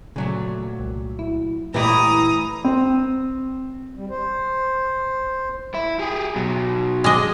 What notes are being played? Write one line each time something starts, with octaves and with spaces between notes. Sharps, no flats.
A#2 C#3 F#3 A3
C2
E4
A#2 E3 A3 E4 G4 D5 A#5 D#6
C4
G3
C5
E4
G4 G#4
B2 F#3
G#3 D4 D#5